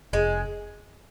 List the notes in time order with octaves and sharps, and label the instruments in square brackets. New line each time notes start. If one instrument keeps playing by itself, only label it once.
[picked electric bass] F1 [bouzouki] G#3